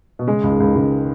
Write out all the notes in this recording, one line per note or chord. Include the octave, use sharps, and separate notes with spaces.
B2
C#3 G#3
C#2
D#3
C#2
D#3
C#2 C#3